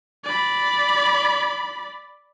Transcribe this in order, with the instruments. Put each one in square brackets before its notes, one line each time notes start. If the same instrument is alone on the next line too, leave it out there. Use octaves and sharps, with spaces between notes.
[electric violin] D5 B5